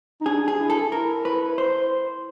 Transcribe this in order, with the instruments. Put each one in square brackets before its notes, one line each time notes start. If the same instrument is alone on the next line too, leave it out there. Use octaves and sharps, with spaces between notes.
[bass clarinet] D#4
[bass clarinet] D4 [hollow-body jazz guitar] G#4
[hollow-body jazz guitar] G#4
[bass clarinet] E4
[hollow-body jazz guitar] A4
[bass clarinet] E4 [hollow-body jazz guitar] A#4
[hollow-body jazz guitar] B4
C5